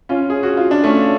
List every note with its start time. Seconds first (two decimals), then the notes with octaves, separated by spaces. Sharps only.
0.09 C#4 F4
0.30 G#4
0.43 F#4
0.57 F4
0.71 D4
0.84 A3 C#4